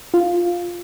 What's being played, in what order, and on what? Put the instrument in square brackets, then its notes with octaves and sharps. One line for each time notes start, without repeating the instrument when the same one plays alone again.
[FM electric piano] F4